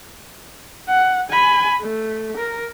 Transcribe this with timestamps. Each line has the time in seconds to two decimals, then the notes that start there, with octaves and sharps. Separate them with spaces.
0.89 F#5
1.30 G#5 B5
1.81 A3
2.37 A#4